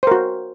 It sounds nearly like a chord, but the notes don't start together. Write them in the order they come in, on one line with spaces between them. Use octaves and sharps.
C5 A#4 F#4